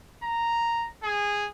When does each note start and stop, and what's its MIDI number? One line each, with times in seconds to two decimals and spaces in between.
0.23 0.87 82
1.03 1.47 68